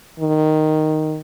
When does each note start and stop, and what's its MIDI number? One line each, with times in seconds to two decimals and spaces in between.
0.20 1.20 51